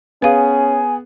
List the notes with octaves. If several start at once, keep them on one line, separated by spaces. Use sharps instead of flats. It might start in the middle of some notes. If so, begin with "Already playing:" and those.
B3 C#4 G#4 B4 F5 G#5